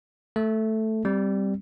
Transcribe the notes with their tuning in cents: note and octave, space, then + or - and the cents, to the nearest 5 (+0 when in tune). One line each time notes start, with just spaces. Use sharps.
A3 +0 A4 +0
G3 +0 C4 +0